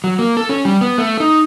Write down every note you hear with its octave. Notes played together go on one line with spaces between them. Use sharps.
F#3
A#3
A4
C#4
G3
B3
A3
D#4